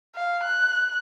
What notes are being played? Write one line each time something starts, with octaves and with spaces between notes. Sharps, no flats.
F5
F#6